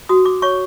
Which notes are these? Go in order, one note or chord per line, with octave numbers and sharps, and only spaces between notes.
F#4 D#6
D6
C#5 C#6